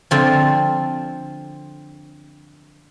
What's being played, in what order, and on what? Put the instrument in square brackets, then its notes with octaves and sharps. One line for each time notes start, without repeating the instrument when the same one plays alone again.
[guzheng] D3 F3 C4